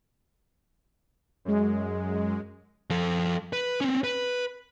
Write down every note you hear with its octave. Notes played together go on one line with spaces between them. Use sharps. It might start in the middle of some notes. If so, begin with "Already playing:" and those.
F#2 G#3
F3 A4
B4
C4 C#4
B4